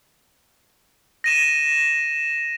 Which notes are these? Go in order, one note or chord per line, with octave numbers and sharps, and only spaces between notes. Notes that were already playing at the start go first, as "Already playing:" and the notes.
A#6 D#7 E7